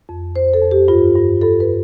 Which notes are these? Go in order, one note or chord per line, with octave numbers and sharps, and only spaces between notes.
F2
F2 C5
A4
F2
G4
G2 F4
G2
G2 A4
B4